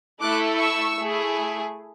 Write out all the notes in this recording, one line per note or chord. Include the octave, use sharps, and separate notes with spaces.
A3 E4 A4 D6 F#6
C#6 E6
A3 E4 G#4